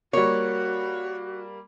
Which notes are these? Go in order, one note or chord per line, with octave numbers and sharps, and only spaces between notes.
G3 A#3 F#4 C#5